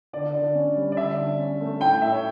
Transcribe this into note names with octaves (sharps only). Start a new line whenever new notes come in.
D3 D5
D3
C#4
G3
D5
D3 E5
D3
C#4
A3
A2 G5
A2 E5
C#5